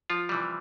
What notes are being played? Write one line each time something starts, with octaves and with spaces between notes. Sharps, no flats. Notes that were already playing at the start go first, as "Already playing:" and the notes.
F3 F4
C3 E3 G3